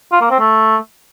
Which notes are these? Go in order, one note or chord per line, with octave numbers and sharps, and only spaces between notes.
F4
A#3
C4
A3